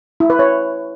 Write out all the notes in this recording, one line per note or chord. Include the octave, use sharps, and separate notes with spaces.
E4
B4
C#5